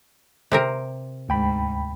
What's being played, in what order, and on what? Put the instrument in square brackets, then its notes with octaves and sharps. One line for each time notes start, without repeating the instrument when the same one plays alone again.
[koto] C3 C4 A#4
[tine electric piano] D2 G5 B5 [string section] G#2